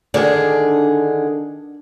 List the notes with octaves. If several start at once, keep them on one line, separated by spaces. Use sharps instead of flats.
D3 D#3 D4 G#4